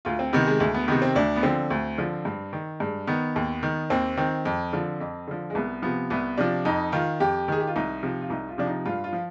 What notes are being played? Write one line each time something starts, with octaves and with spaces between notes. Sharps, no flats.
D2 F4
C4
C3 D#3 B3
G#3
D2 G#3
B3
C3 D#3 B3
C4
D2 D4
B3
D3 F3 C4
D2
D3 F3
G2
D#3
G2 G#3
D#3 B3
D#2
D#3
D#2 C4
D#3 C4
F2
D3 F3
F2
D3 F3
G#3
C2 B3
C3 F3 B3
C2 B3
C3 F3 D4
F2 D#4
D#3 F4
F2 G4
D#3 G#4
G4
F4
C2 D#4
C3 F3
F4
C2 D#4
F4
C3 F3 D4
D#4
G2 F4
F4
F3